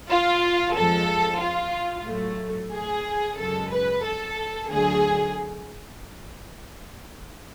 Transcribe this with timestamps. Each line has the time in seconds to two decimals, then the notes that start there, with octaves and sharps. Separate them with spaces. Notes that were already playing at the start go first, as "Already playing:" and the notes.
0.10 F4
0.75 F2 F3 G#3 A4
1.42 F4
2.06 A2 F#3 A3
2.72 G#4
3.37 F#2 C#3 G#3 A4
3.71 B4
4.03 A4
4.69 D2 D3 F#3 A3 G#4